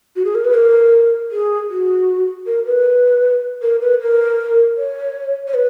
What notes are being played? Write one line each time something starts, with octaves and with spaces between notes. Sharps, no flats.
F#4
G#4
A#4
B4
A#4
G#4
F#4
A#4
B4
A#4
B4
A#4
C#5
C#5
B4